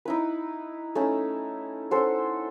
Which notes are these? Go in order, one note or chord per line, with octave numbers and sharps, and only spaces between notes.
D#4 E4 B4
A3 C#4 D#4 E4
C#4 A4 C5 F#5